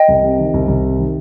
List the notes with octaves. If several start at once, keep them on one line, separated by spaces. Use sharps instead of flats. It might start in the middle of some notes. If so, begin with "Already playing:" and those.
Already playing: D#5 G5
C2
C3
D#3
C2
C2
C3
D#3